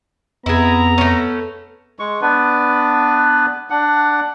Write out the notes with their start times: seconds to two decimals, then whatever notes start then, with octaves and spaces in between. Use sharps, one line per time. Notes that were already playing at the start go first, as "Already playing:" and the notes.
0.46 F2 B3 E4 G#4 A#5
0.98 A3 C#4
1.99 G#3 C#6
2.21 B3 D4 B4
3.70 D4 F#5